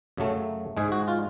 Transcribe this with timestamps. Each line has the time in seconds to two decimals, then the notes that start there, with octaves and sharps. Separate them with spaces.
0.17 F#2 C#3 F#3 A3
0.77 G#2 G#3 G#4
0.92 F#4
1.08 F4